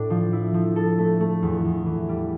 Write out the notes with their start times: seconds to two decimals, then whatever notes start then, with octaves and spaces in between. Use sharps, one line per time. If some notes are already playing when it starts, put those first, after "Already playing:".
Already playing: A2 A3 D4
0.10 F3
0.33 E4
0.54 F3
0.76 A4
0.98 A3
1.20 A3
1.43 E2
1.65 E2
1.86 E3
2.09 G3